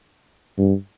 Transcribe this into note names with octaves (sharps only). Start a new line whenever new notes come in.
G2